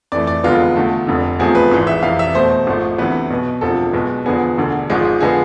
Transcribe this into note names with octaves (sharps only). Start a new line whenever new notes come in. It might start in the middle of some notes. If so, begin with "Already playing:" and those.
F2 E3 A3 D5
D5
F1 E2 D3 G#3 B3 F4
E2 D3 A3
F1 F2 D3
E2 C3 F3 A3 G#4
B4
G#1 G#2 E3 G#3
E5
F2 C3 E3 F5
E5
E2 B2 A3 C5
G#1 G#2 F3 A3
D2 C3 E3 B3 B4
B1 B2 B3
E1 D2 C3 F3 A4
B1 B2 G#3 B3
E2 D3 F3 B3 G#4
E1 D2 D3
G#1 G#2 F3 G#3
D3 F3 G#3 B3 G#4